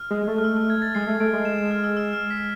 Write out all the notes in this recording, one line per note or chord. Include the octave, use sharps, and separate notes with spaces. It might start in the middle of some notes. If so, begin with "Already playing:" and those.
Already playing: F6
G#3
A3
F6
E6
F6
G#6
A6
G#3 C7
A3
A3 D7
G#3
E7
E7
F6
E6
E6
F6
B6